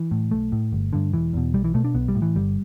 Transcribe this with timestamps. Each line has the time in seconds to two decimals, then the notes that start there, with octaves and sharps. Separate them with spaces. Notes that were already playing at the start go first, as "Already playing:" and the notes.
Already playing: E3
0.11 A2
0.31 B1 A3
0.52 A2
0.72 G1
0.93 G2 D3
1.13 E1 E3
1.33 E2 B2
1.54 B1 G3
1.64 E3
1.74 B2 A3
1.84 D4
1.94 B1 B3
2.08 G3
2.15 A2
2.22 E3
2.35 G1 G3